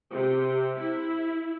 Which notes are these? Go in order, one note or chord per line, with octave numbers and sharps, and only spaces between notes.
C3
E4